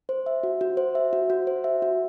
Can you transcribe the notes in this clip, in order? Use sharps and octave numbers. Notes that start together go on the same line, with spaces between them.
C5
E5
F#4
F#4
C5
E5
F#4
F#4
C5
E5
F#4